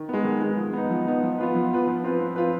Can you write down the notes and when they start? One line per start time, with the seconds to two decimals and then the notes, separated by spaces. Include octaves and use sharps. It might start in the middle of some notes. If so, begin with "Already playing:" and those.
Already playing: D#3
0.09 G#3 B3
0.24 D#3
0.41 G#3 B3
0.57 F3
0.73 B3 D#4
0.90 F3
1.06 B3 D#4
1.23 F3
1.38 B3 F4 B4
1.55 F3
1.71 B3 F4 B4
1.88 F3
2.04 C4 F4 B4
2.20 F3
2.36 C4 F4 B4